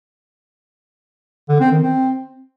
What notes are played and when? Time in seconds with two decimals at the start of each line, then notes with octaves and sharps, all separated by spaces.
1.49 D3
1.60 C4
1.71 D#3
1.83 C4